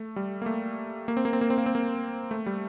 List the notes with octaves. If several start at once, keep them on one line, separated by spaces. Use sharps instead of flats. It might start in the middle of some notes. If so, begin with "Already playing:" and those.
Already playing: A3
G3
A#3
A3
A#3
C4
A#3
C4
A#3
C4
A#3
C4
A#3
A3
G3